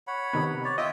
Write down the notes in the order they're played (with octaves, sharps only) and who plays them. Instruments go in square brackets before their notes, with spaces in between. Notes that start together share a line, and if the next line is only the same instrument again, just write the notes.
[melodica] C#5 F#5 B5
[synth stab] C3 D#3 B3
[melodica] C#5 D5
[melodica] F4 E5 G5 [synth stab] D#5